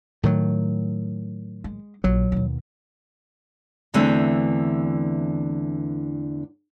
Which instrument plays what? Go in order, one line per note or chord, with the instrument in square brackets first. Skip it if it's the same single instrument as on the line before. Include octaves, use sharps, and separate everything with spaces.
[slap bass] A2 D#3 F#3
[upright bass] G#3
[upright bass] A#1 [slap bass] F#3
[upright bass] D#2 B2
[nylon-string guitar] E2 D3 E3 A3 C4